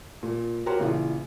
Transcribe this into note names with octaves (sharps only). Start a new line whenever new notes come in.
A#2
F#4 G4 A#4 C#5 C6
A#1 C#3 E3 F4